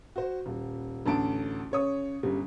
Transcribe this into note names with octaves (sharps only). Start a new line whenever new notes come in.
F#4 C5
D#1
A1 D2 A5 D7
C#3 C#5 D#6
G1 C#3 G3